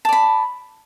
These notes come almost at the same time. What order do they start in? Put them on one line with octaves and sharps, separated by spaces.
A5 D5 B5